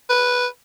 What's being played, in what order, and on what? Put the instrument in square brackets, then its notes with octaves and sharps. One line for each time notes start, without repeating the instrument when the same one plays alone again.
[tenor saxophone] B4